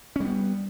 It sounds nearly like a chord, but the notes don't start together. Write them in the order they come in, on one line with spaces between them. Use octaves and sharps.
C#4 G3 B3